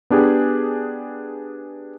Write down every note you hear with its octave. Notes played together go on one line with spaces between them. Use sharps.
B3 D4 G4 G#4